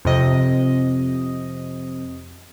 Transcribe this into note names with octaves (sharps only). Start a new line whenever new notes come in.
F2 C3 D#5